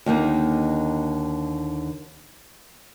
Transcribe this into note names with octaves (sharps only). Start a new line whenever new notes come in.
D#2 D3 A#3 D#4